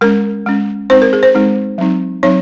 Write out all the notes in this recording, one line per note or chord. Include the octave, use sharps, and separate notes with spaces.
G#3 C#4 A#4
G#3 C#4
G#3 C4 D#4 C5
A#4
G#4
C5
G#3 C4 D#4
F#3 C4 D#4
F#3 C4 D#4 C#5